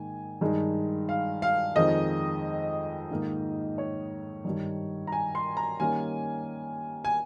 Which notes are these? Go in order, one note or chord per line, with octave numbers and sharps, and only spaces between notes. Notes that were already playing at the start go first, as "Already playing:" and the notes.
Already playing: G#2 D#3 A#3 D#4 G#5
G2 D#3 G#3 D#4
F5
F5
F2 D#3 G#3 C4 D#5
G#2 D#3 A#3 D#4
C#5
G2 D#3 G3
A#5
G#5
C6
A#5
D#3 G3 A#3 C#4 G#5
G#5